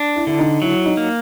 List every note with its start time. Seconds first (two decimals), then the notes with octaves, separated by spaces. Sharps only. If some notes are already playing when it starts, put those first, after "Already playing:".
Already playing: D4
0.16 E4
0.27 D3 E4
0.39 D#4
0.62 F#3 E4
0.86 D#4
0.97 A#3